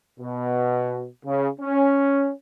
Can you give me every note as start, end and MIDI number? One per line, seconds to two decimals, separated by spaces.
0.20 1.06 47
1.26 1.49 49
1.60 2.32 61